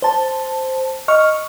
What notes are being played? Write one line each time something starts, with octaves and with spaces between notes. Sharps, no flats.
C5 A5
D#5 C#6 F6